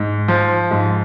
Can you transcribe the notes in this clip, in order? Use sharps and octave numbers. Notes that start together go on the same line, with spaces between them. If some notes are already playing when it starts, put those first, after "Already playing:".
Already playing: G#2
F3
G#2